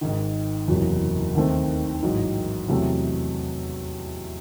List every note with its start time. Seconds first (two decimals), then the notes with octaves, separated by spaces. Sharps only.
0.01 G#1 G#2 D#3
0.68 F#1 E2 C3 F#3
1.35 D#2 D#3 A3 C4
2.02 A1 G#2 F#3
2.68 E2 C3 F#3 A3